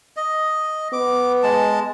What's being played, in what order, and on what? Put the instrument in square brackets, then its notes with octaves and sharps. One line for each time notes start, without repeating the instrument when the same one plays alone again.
[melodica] D#5
[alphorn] B3 [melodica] D6
[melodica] G#3 A5